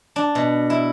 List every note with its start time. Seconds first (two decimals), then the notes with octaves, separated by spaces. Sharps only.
0.16 D4
0.35 B2
0.70 E4